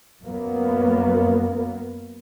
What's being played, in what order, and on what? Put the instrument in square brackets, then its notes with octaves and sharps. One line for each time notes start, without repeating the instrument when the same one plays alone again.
[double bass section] F#2 F#3 A#3 B3